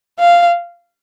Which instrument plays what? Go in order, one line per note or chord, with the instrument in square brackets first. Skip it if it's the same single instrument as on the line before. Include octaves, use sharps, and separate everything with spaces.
[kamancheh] F5